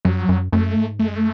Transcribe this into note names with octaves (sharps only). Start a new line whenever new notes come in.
F#2 F#3
F#2
F#2 A3
G#2
F#2 A3
G#3
A3